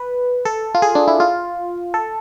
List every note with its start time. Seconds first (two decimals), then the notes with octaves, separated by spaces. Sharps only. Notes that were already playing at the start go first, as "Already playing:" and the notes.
Already playing: B4
0.45 A4
0.75 F4
0.82 G#4
0.95 D4
1.08 E4
1.20 F4
1.94 A4